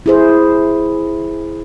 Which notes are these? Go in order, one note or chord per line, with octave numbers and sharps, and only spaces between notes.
E4 G#4 C5